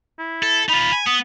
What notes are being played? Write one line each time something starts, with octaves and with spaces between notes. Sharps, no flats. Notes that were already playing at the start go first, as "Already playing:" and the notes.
E4
A4
D#4 F4 B5
G#5
B3 D#6